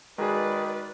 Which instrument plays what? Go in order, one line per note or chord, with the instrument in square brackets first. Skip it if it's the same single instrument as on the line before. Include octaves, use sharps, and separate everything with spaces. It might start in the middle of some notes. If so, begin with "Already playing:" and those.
[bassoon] D#3 [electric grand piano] G#3 F#4 G#4 [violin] B4 D5